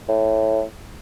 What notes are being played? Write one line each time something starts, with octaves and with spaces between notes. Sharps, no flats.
A2